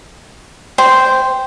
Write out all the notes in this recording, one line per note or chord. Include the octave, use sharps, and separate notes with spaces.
C5 G5